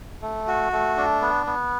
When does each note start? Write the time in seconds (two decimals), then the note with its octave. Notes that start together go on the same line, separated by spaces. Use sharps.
0.22 A3
0.48 F#4
0.72 A3
0.97 D4
1.21 B3
1.47 B3